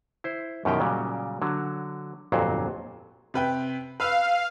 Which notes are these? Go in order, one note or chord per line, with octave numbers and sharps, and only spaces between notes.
E4 C5
F#2 B2 D#3 E3 G4 G5
A#2 C#3 F#3 G3
D3 F#3
G1 F2 A#2 F#3 C5
C3 B4 G5
B4 F5 E6